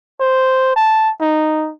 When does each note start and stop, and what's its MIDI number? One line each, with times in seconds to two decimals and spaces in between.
0.20 0.75 72
0.76 1.11 81
1.21 1.71 63